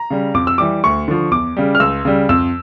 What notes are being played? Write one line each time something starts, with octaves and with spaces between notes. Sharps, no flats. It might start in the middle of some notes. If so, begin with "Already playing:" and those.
Already playing: A#5
C#3 G3
F2 D6
E6
E3 G3 D6
D2 C#6
D3 F3
E2 D6
C#3 G3
F6
C#2 E6
C#3 G3
F2 E6